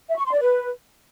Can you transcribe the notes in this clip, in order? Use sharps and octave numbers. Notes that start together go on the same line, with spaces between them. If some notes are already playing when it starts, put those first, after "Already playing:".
E5
C#6
C6
D5
B4